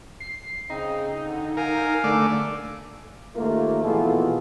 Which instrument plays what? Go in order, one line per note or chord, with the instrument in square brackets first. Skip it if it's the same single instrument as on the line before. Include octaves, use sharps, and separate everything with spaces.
[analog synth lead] C7
[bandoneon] C#3 C4 [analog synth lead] D#4
[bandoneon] D3
[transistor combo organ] A#4 [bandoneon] F5 G#5
[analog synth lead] D3 [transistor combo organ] A3 D5
[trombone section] D#2 A3 A#3 F4 A#4
A#1 B2 E3 F4 G#4 A4